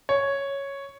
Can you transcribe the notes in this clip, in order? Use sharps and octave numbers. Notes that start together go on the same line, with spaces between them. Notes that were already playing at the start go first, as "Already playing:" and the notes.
C#5